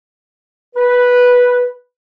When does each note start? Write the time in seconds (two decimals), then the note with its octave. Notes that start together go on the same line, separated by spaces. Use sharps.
0.75 B4